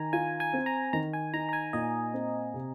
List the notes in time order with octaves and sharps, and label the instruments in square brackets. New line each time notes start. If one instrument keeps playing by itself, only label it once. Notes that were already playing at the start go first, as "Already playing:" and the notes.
Already playing: [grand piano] D#3 [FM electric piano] G#5 A#5
[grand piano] F4 [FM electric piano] G#5
[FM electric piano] G#5
[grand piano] C4
[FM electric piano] A#5
[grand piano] D#3 [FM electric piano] A#5
[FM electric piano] G#5
[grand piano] D#4 [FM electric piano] A#5
[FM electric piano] A#5
G#5
[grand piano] A#2 [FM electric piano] D#5
[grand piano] C4
C3